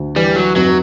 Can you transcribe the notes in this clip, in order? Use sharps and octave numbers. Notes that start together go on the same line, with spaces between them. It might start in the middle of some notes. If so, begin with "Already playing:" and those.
Already playing: D2
E3 G3
F#3
F1 F#3